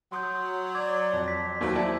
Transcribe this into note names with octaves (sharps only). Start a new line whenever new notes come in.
F#3 C6 D#6 G6
D5 D6 G#6
F2
B6
D#2 D#3 F#3 A3 C5
E4 C5 D5 A5